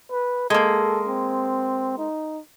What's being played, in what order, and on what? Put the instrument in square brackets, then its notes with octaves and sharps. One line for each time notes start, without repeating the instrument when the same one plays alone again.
[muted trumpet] B4
[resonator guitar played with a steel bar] G#3 A#3 [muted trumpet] A4
[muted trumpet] C4
D#4